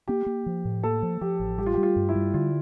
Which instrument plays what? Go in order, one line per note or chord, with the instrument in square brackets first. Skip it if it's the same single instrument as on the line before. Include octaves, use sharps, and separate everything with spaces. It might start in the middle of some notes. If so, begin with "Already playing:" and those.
[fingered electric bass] A#3 [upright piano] G4
[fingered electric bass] A#3
F3
A2
[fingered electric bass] A#3 [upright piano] A4
[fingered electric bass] F3
[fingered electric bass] F3 [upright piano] G4
[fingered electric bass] A1
[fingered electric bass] G3 [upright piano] G4
[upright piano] F4
[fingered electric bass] G3 [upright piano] G4
[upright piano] F4
[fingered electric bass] G2
[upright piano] E4
[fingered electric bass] G3
[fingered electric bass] D3 [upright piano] F4